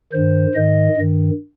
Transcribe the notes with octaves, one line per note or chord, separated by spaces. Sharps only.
G2 D#3 C5
G#2 D#3 D#5
G2 D#3